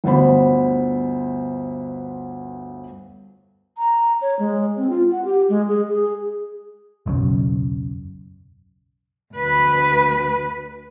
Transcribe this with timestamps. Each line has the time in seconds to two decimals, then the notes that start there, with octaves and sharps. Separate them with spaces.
0.04 G1 D2 B3 C5 B5
3.78 A#5
4.21 C#5
4.39 G#3
4.77 C4
4.90 F4
5.12 F#5
5.25 G4
5.49 G#3
5.68 G#4
5.88 G#4
7.06 E1 B1 F#2 C#3
9.34 D2 B4